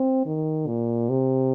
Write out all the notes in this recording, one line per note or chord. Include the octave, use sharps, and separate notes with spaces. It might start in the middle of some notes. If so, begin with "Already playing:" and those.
Already playing: C4
D#3
A#2
C3